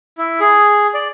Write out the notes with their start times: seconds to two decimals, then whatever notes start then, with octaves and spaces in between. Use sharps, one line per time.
0.18 E4
0.40 G#4
0.94 D5